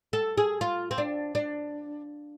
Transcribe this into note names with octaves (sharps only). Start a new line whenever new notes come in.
A4
G#4
F4
C4
D4
D4